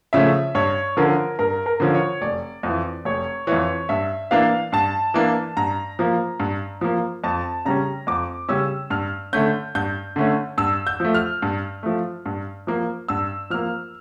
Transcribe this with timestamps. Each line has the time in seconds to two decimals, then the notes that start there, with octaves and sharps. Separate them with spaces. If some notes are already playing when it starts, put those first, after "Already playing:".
0.13 C#3 F3 A3 C#4 E5
0.55 G2 C#5
0.97 D3 F3 C#4 A#4
1.39 G2 A#4
1.66 A#4
1.80 D3 F3 C#4
1.95 C#5
2.22 F1 D5
2.63 F2 E3
3.05 F1 C#5
3.47 F2 E3 C#5
3.89 G2 E5
4.31 E3 A#3 D4 F5
4.72 G2 A5
5.14 E3 A#3 D4
5.57 G2 A#5
5.99 F3 A#3
6.40 G2
6.81 F3 A#3
7.24 F2 A5
7.65 C#3 G3 C#4 A#5
8.07 F2 D6
8.49 C#3 G3 C#4 E6
8.90 G2 F6
9.33 D3 A3 C#4 G6
9.75 G2 G6
10.16 D3 A3 C#4
10.58 G2 E6
10.87 G6
11.00 F3 A3
11.14 F6
11.42 G2
11.83 F3 A3
12.26 G2
12.67 F3 A#3
13.09 G2 E6
13.50 F3 A#3 F6